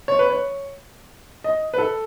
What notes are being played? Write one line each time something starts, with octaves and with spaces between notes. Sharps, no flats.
C#5
B4
C#5
D#5
B4
A4